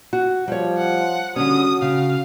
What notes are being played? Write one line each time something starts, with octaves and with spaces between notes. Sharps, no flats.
F#4
F3 G3 C#5
F#5
D3 G3 C#4 F#4 D#6
C#3 F5